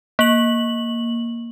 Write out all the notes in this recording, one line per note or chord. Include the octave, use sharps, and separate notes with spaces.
A#3 F#7